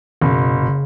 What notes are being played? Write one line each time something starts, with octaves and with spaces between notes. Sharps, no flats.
F#1 B2
B2
C#3